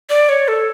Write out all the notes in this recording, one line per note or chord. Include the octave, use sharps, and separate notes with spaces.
D5
C#5
A4